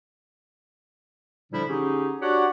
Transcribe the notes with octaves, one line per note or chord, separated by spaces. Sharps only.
A#2 D3 F3 G3 D4 E4
D3 C#4 D#4 G4 G#4
D4 F#4 G4 C#5 D5 F#5